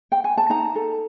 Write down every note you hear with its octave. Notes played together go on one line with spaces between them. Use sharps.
G5
G#5
A5
D#4 A#5
A4